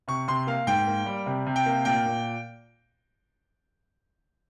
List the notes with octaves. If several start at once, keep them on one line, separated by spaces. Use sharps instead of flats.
C3 C#6
C3 C6
A#3 F5
G#2 G5
A#3
G3
C3
C3
G5
A#3
A#2 G5
A#2